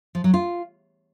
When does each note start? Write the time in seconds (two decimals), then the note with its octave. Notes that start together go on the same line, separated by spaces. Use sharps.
0.15 F3
0.24 F#3
0.34 F4